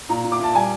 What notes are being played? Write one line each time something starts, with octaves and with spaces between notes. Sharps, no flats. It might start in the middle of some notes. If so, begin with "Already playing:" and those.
A#2 A#5
A#2
D6
A#2 A5
G3 G#5